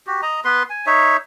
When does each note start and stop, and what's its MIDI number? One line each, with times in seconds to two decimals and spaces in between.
0.07 0.21 66
0.07 0.21 67
0.22 0.40 75
0.22 0.40 82
0.44 0.63 59
0.44 0.63 71
0.44 0.63 84
0.70 0.86 80
0.86 1.17 63
0.86 1.17 73
0.86 1.17 76